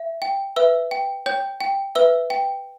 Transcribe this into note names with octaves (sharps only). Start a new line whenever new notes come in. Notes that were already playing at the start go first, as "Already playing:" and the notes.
Already playing: E5
G5
B4 E5 E6
G5
C#5 G5 G6
G5
B4 E5 E6
G5